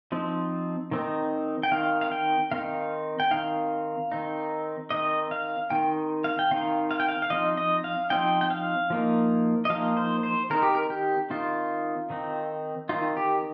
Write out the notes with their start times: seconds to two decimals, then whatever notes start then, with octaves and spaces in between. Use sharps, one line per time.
0.12 F3 C4 D#4
0.91 D#3 C4 D#4
1.63 G5
1.72 D#3 C4 D#4 F5
2.01 F5
2.12 G5
2.51 D#3 C4 D#4 F5
3.20 G5
3.31 D#3 C4 D#4 F5
4.12 D#3 C4 D#4
4.91 D#3 C4 D#4 D#5
5.31 F5
5.70 D#3 C4 D#4 G5
6.24 F5
6.39 G5
6.51 D#3 C4 D#4 F5
6.91 F5
7.00 G5
7.09 F5
7.22 F5
7.30 F3 C4 D#4 D#5
7.57 D#5
7.84 F5
8.10 F3 C4 D#4 G5
8.41 G5
8.50 F5
8.90 F3 A#3 D#4
9.65 D#5
9.70 F3 A#3 D#4 F5
9.97 C5
10.23 C5
10.50 D#3 C4 D#4 A#4
10.62 G4
10.75 A#4
10.90 G4
11.30 D#3 C4 D#4 F4
12.10 D#3 C4 D#4
12.89 D#3 C4 D#4 F4
13.17 G4